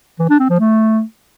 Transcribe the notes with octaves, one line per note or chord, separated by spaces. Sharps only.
E3
D4
C4
F3
A3